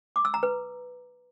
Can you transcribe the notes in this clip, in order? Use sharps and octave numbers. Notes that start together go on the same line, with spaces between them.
D6
E6
A#5
B4